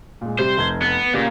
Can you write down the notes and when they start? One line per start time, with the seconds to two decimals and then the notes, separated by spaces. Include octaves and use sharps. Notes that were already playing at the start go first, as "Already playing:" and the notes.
0.21 A#2 G#3
0.39 C3 G3 C5
0.58 F1 G#6
0.82 B3
1.14 A#2 C#3 G4